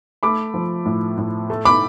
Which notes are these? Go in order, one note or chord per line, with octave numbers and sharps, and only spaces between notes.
A3 B5 D6
F3
A2
A2
A3
B5 D6